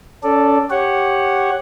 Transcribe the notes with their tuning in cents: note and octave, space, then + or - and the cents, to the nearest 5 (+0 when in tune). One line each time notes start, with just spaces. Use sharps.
C#4 +25 A4 +0 D5 +0
G4 +0 C#5 -15 F#5 +0